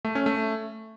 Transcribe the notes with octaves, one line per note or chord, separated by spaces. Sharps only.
A3
C#4
A3